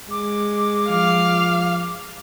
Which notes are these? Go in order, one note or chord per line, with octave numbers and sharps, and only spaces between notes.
G#3 D6
F3 F5